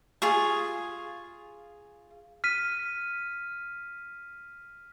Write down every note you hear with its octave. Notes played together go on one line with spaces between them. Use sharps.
F4 G#4 C#6
F6 B6 D#7